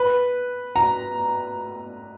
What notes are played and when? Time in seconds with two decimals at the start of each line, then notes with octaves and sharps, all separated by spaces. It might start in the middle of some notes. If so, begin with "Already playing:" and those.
Already playing: B4
0.76 A#5